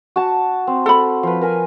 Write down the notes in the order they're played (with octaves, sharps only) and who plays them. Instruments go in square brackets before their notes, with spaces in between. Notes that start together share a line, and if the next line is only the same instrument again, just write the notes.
[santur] F#4 A5
C4
[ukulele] A4 B5
[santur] F3 B4
A#4 B4 G#5